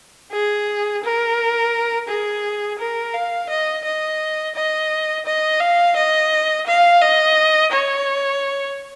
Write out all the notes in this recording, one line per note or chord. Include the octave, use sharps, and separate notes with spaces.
G#4
A#4
G#4
A#4
F5
D#5
D#5
D#5
D#5
F5
D#5
F5
D#5
C#5